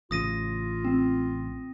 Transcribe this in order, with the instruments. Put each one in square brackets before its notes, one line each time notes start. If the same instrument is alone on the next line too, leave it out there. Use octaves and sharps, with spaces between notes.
[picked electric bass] A1 C#3 [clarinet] F4 [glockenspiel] D#6 A#6 D#7
[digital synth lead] C4